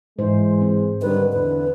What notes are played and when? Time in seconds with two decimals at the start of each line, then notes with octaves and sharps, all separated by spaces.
0.19 G#2 E3 G#3 C5
0.62 C4
1.02 D3 D#3 G3 B4
1.32 E2 D3 B4